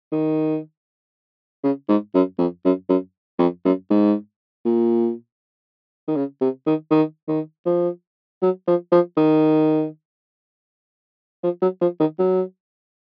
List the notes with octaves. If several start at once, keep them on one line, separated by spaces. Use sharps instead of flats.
D#3
C#3
G#2
F#2
F2
F#2
F#2
F2
F#2
G#2
A#2
D#3
C#3
C3
D#3
D#3
D#3
F3
F#3
F3
F3
D#3
F3
F#3
F3
D#3
F#3